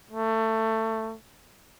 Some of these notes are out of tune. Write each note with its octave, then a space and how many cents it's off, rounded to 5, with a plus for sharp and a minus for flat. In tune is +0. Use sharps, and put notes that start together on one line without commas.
A3 +20